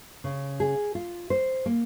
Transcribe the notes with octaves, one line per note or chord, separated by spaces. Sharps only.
C#3
G#4
F4
C5
A#3